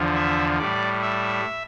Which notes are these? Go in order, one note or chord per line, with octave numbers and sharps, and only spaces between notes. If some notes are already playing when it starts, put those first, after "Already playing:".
Already playing: E2 D3 F3
E5
A2 G3 D5
E5